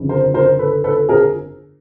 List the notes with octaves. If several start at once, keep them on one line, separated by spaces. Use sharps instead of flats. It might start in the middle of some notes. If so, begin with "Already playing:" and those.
Already playing: G1 F2 C#3
A#4 C5
A#4 C5
A4 B4
A4 B4
G#4 A#4